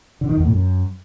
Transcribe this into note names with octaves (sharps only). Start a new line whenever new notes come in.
D3
D#3
E2
A2
F#2